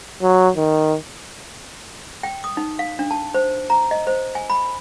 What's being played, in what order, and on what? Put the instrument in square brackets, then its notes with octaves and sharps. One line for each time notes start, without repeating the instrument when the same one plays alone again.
[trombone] F#3
D#3
[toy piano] G5
D#6
D#4
F5
D4
A5
C5
A#5
D#5
C5
G#5
B5